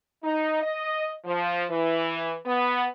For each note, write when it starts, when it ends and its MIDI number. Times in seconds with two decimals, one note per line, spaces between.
0.24 0.60 63
0.63 1.13 75
1.25 1.64 53
1.70 2.37 52
2.46 2.86 59